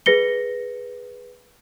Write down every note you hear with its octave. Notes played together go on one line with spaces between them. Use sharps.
G#4 B4 A#6 C#7 G7